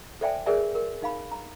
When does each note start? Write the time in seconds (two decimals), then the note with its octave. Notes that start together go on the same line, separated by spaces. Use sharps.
0.21 A4 C5 D5 E5 G5 G#5
0.46 G#4 A#4 B4 D5 E5 G#5
0.75 A#4
1.02 D#4 F5 B5
1.32 A#5